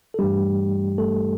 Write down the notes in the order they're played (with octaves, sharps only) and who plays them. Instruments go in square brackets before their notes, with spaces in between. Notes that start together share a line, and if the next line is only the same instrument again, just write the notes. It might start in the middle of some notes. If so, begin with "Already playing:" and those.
[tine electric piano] A4
G2 E3 G3 A3 D4 G4
A3 A4